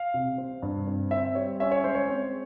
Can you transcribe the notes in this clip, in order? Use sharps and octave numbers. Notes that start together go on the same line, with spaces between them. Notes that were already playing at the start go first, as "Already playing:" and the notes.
Already playing: F5
C3
C4
G2
C4
C4 E5
G3 C#5
C#4 E5
C#5
G#3 C5
C#5
C4